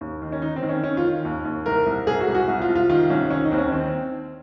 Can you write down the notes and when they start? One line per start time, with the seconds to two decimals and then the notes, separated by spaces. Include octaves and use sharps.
0.01 D#2
0.22 D#3
0.32 C#4
0.42 D#3 D#4
0.56 C4
0.63 D#3
0.69 C#4
0.83 D#3 C#4
0.97 F4
1.04 D#3
1.25 D#2
1.45 D#2
1.66 C2 A#4
1.86 C2
2.07 C2 G#4
2.20 F#4
2.28 C2
2.35 F#4
2.48 C2
2.62 F4
2.68 C2
2.75 F4
2.90 D#3 F4
3.10 C2 C#4
3.31 D#3 C#4
3.44 D#4
3.51 D#2 C4
3.58 C#4
3.72 D#3 C4